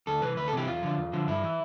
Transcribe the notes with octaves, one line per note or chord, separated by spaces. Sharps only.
D2 A4
C3 E3 B4
D2 B4
A4
C3 E3 G4
E2 F4
D3 F3
E2
D3 F3
G2 E4
E3